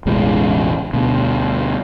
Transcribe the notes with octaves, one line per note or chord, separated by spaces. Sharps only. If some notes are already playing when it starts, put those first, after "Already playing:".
E1 A1 C#3 G#3
D2 B2